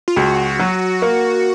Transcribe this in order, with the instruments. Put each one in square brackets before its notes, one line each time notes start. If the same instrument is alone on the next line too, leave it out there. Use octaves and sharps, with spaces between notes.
[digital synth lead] F4
[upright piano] C#2 [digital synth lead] F#4
[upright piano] F#3
A#3